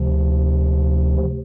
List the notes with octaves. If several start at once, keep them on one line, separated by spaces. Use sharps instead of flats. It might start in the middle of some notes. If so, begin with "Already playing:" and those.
Already playing: D2 C3 F3